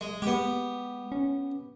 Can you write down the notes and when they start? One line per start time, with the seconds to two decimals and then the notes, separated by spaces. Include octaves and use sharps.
0.01 G#3
0.22 G#3 B3 G4
1.12 C#4